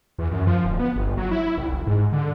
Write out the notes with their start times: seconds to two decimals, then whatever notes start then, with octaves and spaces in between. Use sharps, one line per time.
0.18 E2
0.31 F#2
0.47 F3
0.65 D1
0.79 B3
0.96 G1
1.17 F#3
1.31 E4
1.58 C2
1.71 F1
1.87 G#2
2.12 D3